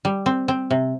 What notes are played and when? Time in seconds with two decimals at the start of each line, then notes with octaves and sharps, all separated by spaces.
0.05 G3
0.26 C4
0.48 C4
0.71 C3